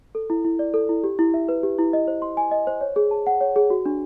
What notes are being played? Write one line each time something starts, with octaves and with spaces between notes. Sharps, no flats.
A4
E4
E4
D5
A4
E4
G4
E4
E5
B4
G4
E4
D#5
C5
C6
G#5
D#5
C5
C#5
G#4
A5
F#5
C#5
G#4
F#4
D4